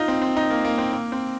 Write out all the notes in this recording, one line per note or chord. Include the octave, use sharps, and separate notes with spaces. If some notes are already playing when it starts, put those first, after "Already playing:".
Already playing: D#4 F4
C4
C4
D#4
A#3
A#3
C4
A#3
C4